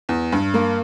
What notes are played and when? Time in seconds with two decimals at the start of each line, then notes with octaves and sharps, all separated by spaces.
0.09 E2
0.32 G2
0.54 A#3